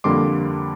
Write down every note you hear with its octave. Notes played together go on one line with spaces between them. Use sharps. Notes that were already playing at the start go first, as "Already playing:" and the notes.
F2 D3 G3 A#3 C6 D6